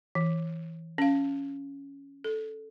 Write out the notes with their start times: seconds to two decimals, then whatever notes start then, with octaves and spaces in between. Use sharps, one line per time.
0.15 E3
0.98 C#4 F5
2.24 A4